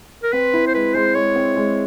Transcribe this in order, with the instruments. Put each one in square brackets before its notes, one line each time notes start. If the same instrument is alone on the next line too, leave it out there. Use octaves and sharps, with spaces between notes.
[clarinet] A#4
[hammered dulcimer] C4 [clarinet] B4
[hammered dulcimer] E4
[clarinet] C5
[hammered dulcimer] G#3 [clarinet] B4
[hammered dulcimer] G#3 [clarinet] C5
[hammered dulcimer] G#3 [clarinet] C#5
[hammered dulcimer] C4
G#3